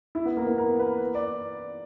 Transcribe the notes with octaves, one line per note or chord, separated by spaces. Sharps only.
E4
B3
A#3
B3
A#4
B4
D5